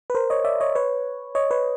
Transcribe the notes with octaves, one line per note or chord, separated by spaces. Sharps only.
B4
A#4 C5
C#5 D#5
D5 E5
C#5 D#5
B4 C#5
C#5 D#5
B4 C#5